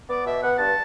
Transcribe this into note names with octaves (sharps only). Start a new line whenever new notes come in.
B3 D5
B2 E5
B3 F#5
G2 A5